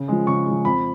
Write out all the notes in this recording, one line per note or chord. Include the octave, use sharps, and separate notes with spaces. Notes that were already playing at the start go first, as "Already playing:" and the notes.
Already playing: C#3
F3 G#3
C#3 C#6
F3 G#3
F2 B5